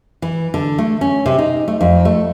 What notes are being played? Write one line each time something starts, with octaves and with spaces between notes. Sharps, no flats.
E3
D3
A3
C#4
C3
D#4
A3
F2
A3